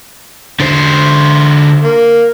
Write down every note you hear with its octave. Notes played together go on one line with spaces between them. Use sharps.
D3 C5
A#3